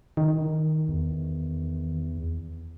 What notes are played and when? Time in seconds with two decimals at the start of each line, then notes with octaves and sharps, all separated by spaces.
0.17 D#3
0.88 E2